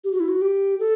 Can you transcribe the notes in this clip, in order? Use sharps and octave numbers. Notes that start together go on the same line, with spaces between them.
G4
F#4
E4
F#4
G4
A4